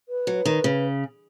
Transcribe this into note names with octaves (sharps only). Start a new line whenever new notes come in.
B4
F#3
D#3
C#3